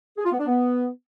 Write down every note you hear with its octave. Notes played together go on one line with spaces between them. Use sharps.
G#4
F4
B3
D4
B3